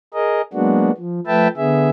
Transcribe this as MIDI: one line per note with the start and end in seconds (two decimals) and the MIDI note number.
0.14 0.42 68
0.14 0.42 70
0.14 0.42 75
0.53 0.91 54
0.53 0.91 56
0.53 0.91 58
0.53 0.91 59
0.53 0.91 62
0.53 0.91 66
0.97 1.20 53
1.27 1.48 53
1.27 1.48 57
1.27 1.48 71
1.27 1.48 76
1.27 1.48 79
1.27 1.48 81
1.57 1.90 50
1.57 1.90 59
1.57 1.90 68
1.57 1.90 76